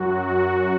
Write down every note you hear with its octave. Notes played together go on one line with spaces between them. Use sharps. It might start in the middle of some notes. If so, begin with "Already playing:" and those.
Already playing: F#2 F#3 F#4
F#4